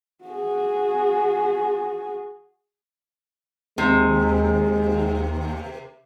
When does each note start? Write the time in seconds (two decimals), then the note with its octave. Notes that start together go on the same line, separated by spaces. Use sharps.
0.24 F#4 G#4
3.78 D#2 C3 G#3